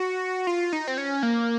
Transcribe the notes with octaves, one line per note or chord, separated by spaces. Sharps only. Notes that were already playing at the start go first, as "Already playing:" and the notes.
Already playing: F#4
F4
D#4
C4
C#4
A#3